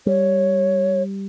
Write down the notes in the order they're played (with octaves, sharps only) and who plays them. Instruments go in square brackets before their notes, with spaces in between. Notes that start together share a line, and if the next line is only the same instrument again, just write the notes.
[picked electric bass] G3 [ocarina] C#5